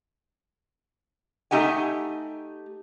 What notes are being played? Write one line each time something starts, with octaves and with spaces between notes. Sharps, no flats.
A3 C4 D#4 G4 F#5 G#5